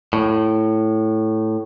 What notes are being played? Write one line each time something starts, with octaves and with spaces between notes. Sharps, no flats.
A2